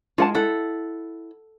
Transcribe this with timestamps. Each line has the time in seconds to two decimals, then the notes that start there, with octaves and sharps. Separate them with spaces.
0.18 G#3 F4 F#5 A5
0.35 E4 A4 F#5